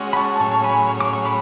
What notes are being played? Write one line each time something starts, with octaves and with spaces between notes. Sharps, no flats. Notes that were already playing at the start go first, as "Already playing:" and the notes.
Already playing: G#3 C#4 F#4
B5
A5 C#6
A2 F#3 C#4 G#4 C#5 A5 C#6
G#5 B5
D6
C#6
B5 D6